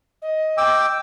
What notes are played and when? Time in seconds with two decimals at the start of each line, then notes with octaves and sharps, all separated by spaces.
0.22 D#5
0.57 G5 D6 E6